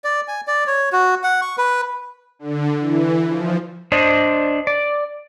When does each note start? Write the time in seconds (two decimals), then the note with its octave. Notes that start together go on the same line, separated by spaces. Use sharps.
0.04 D5
0.28 G#5
0.47 D5
0.67 C#5
0.92 F#4
1.23 F#5
1.42 C#6
1.58 B4
2.39 D3
2.80 E3
3.28 F3
3.92 D4 C5 D5 D#5
4.67 D5